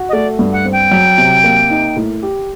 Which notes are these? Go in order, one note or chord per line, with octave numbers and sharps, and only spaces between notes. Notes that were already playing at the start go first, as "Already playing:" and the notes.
Already playing: F#4
D#5
A3 D5
G2
F#5
C4
G5
F#3
C3
A#3
D#4
A2
G4